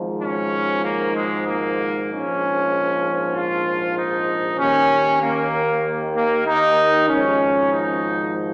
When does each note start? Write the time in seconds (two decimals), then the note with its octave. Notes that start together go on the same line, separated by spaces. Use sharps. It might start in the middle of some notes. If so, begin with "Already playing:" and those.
Already playing: G#1 G#2 F3
0.22 C#4
0.84 A#3
1.15 G#3
1.46 A#3
2.09 A#1 G#2 F3 C#4
3.34 F4
3.97 D#4
4.59 D#2 D#3 C#4
5.22 A#3
6.16 A#3
6.46 D#4
7.09 G#1 G#2 F3 C#4
7.71 D#4